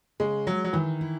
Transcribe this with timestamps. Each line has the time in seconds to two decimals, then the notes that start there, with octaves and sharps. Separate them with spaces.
0.20 C#3 G#3
0.46 F#3 G#3
0.64 F#3
0.73 D#3 E3
1.01 E4